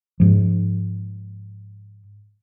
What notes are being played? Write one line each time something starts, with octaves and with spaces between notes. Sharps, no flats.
G#2 F3